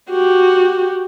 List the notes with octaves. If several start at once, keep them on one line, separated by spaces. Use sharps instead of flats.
F#4 G4